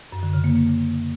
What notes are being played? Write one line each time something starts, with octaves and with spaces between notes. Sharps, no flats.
F#2
D3
C#3
A#3